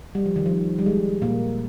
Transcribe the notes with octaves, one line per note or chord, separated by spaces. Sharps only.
G3
F3
D#3
F3
G3
G#3
A#2 A#3